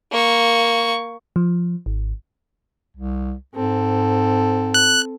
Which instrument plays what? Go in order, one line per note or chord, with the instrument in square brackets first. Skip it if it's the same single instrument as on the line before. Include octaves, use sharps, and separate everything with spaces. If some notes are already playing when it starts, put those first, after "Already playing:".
[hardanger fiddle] A#3 C#6
[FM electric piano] F3
G#1
[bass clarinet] C2
[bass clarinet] G#2 [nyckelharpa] C4 A4
[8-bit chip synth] F#6